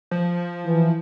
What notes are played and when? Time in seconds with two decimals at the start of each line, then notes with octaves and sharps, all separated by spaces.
0.11 F3
0.66 E3